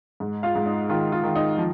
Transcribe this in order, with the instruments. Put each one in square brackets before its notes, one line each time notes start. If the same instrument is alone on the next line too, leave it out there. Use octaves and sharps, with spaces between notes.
[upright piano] G#2
F4 F5
G#2
D#4
D#3 F4
F4
D#3
D#4
F3